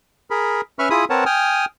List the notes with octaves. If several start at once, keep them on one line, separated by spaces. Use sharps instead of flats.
G#4 A#4 B5
C#4 B4 E5 B5 C#6 F6
E4 F4 G#4 B5 D#6
C4 A#4 B4 C#5 F#5 A5
G5 G#5 D#6 F6